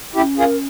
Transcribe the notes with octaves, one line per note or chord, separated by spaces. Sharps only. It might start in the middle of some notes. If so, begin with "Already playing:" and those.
C#4 E4 G4
F4 G#4 A#4